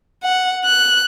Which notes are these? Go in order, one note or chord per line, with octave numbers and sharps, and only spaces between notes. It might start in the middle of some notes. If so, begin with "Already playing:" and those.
F#5
F#6